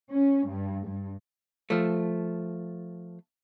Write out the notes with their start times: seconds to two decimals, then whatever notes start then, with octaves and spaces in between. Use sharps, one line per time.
0.11 C#4
0.48 G2
0.86 G2
1.70 F3 A3